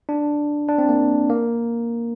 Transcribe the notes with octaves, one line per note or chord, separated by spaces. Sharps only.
D4
D4
C4
A#3
A#3